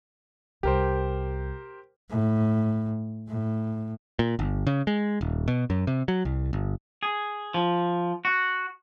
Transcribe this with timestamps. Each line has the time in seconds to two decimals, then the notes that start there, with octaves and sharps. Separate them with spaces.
0.63 C2 G4 A#4 C5
2.10 A2
3.28 A2
4.19 A#2
4.39 G1
4.67 C#3
4.87 G#3
5.21 D#1
5.48 B2
5.70 F#2
5.87 C3
6.08 F#3
6.25 C2
6.53 G1
7.03 G#4
7.54 F3
8.25 F#4